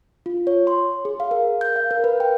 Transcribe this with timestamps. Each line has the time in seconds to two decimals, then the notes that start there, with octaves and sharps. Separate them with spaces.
0.26 F4
0.47 C#5
0.67 C6
1.05 G#4
1.20 F5
1.31 A#4
1.61 G6
1.76 F5
1.91 A#4
2.04 B4
2.20 G5